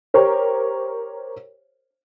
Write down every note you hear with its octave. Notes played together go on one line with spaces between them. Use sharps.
G4 A#4 C5 C#5